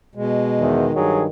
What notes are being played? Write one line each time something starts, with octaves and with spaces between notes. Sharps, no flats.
B2 G#3
E2 D#3
G2 F#3 G#4